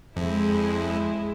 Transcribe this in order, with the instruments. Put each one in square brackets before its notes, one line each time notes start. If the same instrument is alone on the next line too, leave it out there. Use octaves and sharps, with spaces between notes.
[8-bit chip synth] F2 [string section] G#3 E4